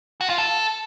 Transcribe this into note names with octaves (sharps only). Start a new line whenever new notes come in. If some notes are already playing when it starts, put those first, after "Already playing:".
F#4
F4
A4